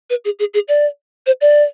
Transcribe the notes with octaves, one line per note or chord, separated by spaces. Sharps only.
B4
G#4
G#4
G#4
D5
C5
D5